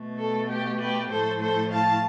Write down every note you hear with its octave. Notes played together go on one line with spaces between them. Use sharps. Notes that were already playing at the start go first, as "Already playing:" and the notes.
Already playing: B2 A3
A4
G4
G4 B4
A2 F3 A3 A4 C5
A4 C5
F5 A5